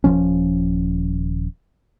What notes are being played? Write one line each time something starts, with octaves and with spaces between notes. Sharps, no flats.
D#1 F#2 F3 C#4